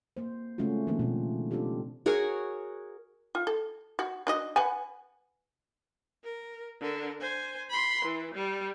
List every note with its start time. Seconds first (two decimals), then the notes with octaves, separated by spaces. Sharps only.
0.17 A#3 C5
0.58 C#3 G#3 A3 C#4 F4 F#4
0.87 D#3 F3 A#3 C4
0.99 B2 A#3 D4
1.51 C4 D4 D#4 F4 G4 A4
2.06 F#4 G#4 A#4 C#5
3.35 F4
3.47 A4
3.99 F#4
4.27 D4 F#4 D#5
4.56 B4 F#5 G#5
6.24 A#4
6.81 D3 A#4
7.21 C5 G#5
7.70 B5 C6
8.05 E3
8.34 G3